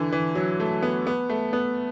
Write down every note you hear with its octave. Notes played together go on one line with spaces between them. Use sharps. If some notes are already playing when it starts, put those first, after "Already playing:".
Already playing: D3 E3
E3
F#3
A3
B3
B3
A3
B3